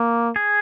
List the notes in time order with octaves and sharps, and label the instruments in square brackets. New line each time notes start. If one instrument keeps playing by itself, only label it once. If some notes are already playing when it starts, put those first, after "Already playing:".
Already playing: [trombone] A#3
[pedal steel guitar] G#4